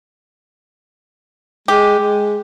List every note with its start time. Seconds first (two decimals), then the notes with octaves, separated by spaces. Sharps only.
1.68 G#3 G4
1.99 G#3